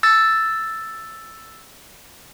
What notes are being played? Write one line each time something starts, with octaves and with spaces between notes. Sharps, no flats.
E6 A6